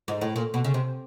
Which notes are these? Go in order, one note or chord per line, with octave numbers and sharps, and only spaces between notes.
G#2
A2
A#2
B2
C#3
C3